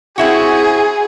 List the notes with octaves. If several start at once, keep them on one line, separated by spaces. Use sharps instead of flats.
C4 E4 F#4 G#4